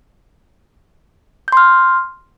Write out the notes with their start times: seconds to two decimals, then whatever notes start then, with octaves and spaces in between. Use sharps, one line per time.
1.48 G6
1.52 C6
1.57 F6